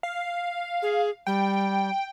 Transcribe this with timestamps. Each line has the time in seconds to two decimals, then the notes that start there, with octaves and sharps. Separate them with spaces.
0.03 F5
0.82 G#4
1.27 G3 G5